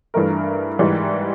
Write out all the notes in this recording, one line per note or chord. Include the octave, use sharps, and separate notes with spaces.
G2 E3 A3 A#4
G#2 E3 G3